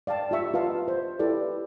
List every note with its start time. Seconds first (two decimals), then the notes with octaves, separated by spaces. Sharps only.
0.07 D5 F5 G5 A5
0.31 F4 G4 E5 C#6
0.54 F4 B4 D#5 F5 A5
0.88 C5
1.19 E4 G4 A4 B4 D5